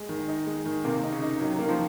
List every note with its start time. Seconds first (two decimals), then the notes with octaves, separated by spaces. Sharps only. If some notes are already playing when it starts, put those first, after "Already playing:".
Already playing: G#3
0.09 D#3
0.28 D#4
0.46 G#3
0.66 D#3
0.84 C3 A#3
1.03 D#4
1.12 C#3
1.22 D#4
1.40 D#3 F#3
1.59 D#3 A#3
1.69 F3